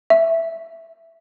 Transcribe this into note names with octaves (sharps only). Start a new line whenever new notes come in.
E5